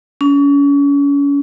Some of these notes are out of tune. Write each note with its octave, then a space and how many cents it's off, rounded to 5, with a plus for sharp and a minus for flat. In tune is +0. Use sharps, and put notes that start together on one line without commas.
C#4 +35